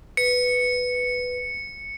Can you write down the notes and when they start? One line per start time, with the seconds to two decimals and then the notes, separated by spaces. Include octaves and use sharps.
0.17 B4 C#7